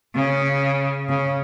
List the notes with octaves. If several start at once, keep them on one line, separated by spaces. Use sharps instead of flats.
C#3
C#3